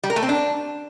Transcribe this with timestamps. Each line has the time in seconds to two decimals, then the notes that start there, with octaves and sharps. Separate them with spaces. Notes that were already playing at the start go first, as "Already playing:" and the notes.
0.04 G3
0.10 A#4
0.16 A3
0.22 C4
0.29 D4